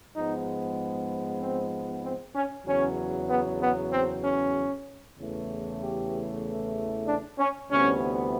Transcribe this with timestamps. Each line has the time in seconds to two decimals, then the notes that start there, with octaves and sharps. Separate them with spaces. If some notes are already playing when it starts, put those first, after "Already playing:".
0.14 G#2 F3 G#3 B3 D#4
1.40 C4
2.03 C4
2.35 C#4
2.66 E2 C#3 F#3 C#4
3.29 B3
3.61 B3
3.92 C4
4.24 C#4
5.19 E2 C#3 E3 A3
5.81 G4
7.07 D4
7.38 C#4
7.70 D2 C3 E3 G3 B3 C#4